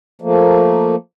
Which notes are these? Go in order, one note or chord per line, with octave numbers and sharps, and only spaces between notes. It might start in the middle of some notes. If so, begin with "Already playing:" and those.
F3 A3 A#3